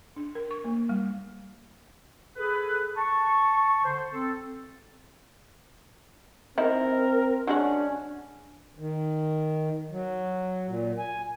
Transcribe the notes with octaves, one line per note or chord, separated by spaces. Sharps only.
D4
A#4
C#6
A#3
G3
G#4 A4 B4
A5 C#6
D3 C5
C4 A4
C4 D#4 E4 A#4
F#3 G#3 C#4 D4 F#4
D#3
F#3
A#2
G#5